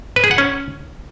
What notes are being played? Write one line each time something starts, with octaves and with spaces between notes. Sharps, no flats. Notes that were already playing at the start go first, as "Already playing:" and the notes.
B4
G#4
F#5
C#4